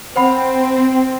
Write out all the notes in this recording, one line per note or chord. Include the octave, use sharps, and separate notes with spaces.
C4 C5 F#5 B5